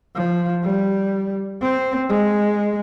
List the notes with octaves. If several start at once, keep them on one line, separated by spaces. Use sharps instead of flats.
F3
G3
C4
G#3